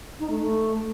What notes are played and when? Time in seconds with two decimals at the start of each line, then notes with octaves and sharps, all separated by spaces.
0.19 D#4
0.30 A3
0.41 A3